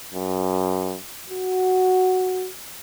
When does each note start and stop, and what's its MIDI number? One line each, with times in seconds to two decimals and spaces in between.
0.14 0.96 42
1.30 2.48 66